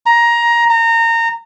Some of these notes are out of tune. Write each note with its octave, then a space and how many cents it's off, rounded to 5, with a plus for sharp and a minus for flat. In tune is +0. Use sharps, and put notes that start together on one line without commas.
A#5 +15
A#5 -25